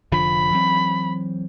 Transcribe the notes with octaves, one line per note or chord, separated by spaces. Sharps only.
F1 D3 F3 B5
E3 F#3 C4